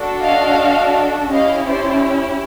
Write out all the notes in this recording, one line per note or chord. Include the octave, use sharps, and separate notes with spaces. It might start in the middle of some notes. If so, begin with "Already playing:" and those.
Already playing: D4 F#4 A4
D#5 F5
C#4 E4 G4 D#5 F5
C5 D5